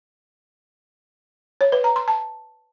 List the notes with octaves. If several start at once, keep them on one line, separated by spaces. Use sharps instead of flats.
C#5
B4
A#5
C6
A5